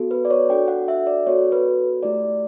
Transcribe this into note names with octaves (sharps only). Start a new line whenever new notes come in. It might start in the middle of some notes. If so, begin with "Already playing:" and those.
Already playing: B3 F#4 A4
B4
D5
C#5
D4 F#4 A4 G5
F#5
E5
D5
B3 F#4 A4 C#5
B4
A3 E4 G4 D5